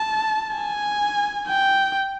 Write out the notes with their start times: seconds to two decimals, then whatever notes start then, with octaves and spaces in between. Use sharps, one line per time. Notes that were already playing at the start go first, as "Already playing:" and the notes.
Already playing: A5
0.57 G#5
1.48 G5